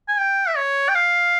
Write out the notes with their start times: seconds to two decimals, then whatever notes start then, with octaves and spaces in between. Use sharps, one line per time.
0.08 G#5
0.19 G5
0.48 E5
0.57 C#5
0.89 G5
0.95 F5